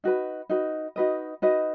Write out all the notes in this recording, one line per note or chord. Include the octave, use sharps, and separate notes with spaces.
D#4 F#4 B4
D#4 F#4 B4
D#4 F#4 B4 D#5
D#4 F#4 B4 D#5